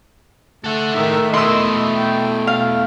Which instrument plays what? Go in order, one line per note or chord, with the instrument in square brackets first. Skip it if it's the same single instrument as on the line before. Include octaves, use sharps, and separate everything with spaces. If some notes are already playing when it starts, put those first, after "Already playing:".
[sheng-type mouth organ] A3 [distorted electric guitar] A4 F#5
[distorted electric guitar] A2 G#3 [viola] D#3 E5
[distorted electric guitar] B2 E4 [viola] D#5 [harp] C6 E6
[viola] G5
[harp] F5